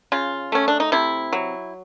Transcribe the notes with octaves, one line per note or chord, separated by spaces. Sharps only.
C#3 F4
A3 C#4
D4
D#4
C3 E4
F#3